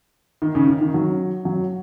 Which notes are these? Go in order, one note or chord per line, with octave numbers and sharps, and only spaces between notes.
D#3
C#3
D#3
D#3
F#3
F#3